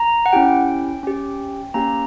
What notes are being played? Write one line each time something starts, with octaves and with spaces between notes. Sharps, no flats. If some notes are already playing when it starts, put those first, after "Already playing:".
Already playing: A#5
F#5
C#4 E4 G4 G5
C#4 G4
A#3 C#4 G4 A#5